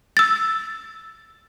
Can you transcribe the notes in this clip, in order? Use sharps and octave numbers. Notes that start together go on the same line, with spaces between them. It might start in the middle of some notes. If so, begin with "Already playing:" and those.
E6 A6